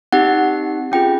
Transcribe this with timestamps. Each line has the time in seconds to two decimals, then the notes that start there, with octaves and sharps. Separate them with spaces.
0.12 C4 D#4 G4 F#5
0.92 C#4 F4 G#4 G5